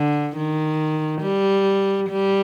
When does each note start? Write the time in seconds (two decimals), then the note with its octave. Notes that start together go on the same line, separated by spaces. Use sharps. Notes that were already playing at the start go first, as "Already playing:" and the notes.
Already playing: D3
0.37 D#3
1.22 G3
2.10 G3